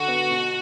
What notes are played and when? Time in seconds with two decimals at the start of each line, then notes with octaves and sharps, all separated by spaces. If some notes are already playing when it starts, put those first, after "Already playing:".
Already playing: D3 F#4
0.08 B3
0.30 B2